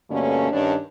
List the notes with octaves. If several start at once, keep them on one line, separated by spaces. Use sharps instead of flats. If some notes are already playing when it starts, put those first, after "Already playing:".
G2 B2 D3 A3 A#3 C#4
G2 D#3 C#4 D4